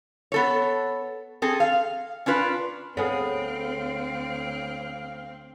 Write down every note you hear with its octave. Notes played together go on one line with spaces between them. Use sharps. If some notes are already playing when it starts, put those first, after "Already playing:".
B3 A4 C#5
C4 G#4 A4
F5
C#4 D4 F4 B4
D2 B3 C4 G#4 A4 C#5 F5